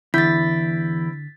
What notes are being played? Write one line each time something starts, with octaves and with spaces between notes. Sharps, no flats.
E2 D3 E4 G6 A6 B6